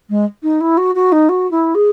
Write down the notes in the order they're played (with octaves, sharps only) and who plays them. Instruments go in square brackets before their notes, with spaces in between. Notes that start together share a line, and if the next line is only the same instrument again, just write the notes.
[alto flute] G#3
D#4
E4
F#4
F#4
D#4
F#4
E4
G#4